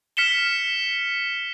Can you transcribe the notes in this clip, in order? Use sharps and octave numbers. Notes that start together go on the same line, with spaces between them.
F6 B6 C#7 E7 G7